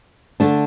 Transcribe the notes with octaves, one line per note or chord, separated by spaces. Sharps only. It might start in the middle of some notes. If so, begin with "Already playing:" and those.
D3 A3 D4